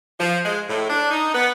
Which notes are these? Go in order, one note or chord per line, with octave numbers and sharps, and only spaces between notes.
F3
G#3
A2
D4
D#4
B3